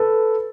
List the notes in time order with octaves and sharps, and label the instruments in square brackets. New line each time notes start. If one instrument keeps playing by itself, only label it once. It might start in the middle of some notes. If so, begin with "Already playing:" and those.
Already playing: [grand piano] A4 B4